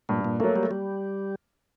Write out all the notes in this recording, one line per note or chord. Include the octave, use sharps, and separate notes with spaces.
G2 A#2
A#2
F#3 A3 A#3
G3
A3
G3